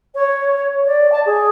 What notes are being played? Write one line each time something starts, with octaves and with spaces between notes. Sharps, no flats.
C#5
D5
A5
G#4